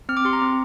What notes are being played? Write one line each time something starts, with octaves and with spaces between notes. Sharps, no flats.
C4 F6
D6
G4 C6
A#5
C4